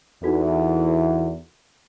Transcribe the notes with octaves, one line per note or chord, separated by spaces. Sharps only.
E2 D#4 F#4 A4